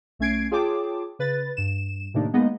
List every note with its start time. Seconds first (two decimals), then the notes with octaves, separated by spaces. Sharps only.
0.19 B1 A3 C#4 G#6 C7 D7
0.51 F4 G#4 C#5 G5 A5 D6
1.19 C#3 B4 A6
1.57 G2 E7
2.14 A2 C3 D#3 A#3 D4 D#4
2.33 G#3 A#3 B3 D#4 D#5